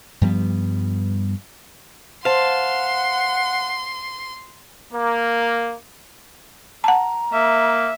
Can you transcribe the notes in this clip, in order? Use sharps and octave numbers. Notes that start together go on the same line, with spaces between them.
G2 F3 G3 B3
C5 F5 F#5 A5 C6
A#3
F#5 A5 A#5
A#3 E5